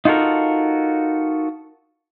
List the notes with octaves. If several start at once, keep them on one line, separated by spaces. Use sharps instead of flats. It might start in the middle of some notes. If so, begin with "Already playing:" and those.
D#4 F4 F#4 A4 A#4